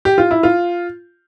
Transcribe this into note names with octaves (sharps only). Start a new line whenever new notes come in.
G4
F4
E4
F4